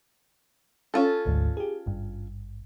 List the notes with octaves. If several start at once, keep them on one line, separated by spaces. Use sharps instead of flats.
C#4 F4 A4
G#1 D2 G#2
G4 G#4
G#1 G2